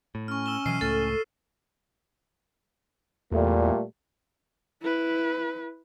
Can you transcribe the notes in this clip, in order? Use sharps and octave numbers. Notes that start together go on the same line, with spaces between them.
A2
C#4 C#6 F6
E6 E7 G7
B2 E3 F#3 C7 D#7
C#2 A2 A3 A4
E2 A#2 G3 A3
E4 B4